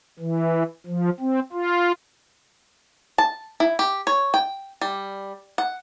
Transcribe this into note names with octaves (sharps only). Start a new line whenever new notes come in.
E3
F3
C4
F4
A5
E4
G4
C#5
G5
G3
F#5